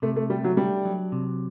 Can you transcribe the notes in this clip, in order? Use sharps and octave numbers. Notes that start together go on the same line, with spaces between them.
C3 A3
A3
G3 A3
F#3
G3 D4
F#3
C3